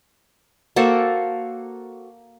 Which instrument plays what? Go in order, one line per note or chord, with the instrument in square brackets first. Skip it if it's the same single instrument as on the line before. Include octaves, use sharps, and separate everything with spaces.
[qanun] A#3 F#4 A4 C5